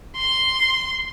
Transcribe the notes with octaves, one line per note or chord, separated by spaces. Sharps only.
C6